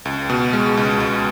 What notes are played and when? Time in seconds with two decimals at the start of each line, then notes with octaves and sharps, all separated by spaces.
0.05 C#2
0.30 B2
0.53 G#3
0.77 C#2
1.00 C#2